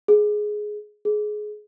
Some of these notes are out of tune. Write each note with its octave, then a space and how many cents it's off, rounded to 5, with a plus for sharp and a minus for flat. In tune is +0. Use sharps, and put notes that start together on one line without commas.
G#4 +10
G#4 +20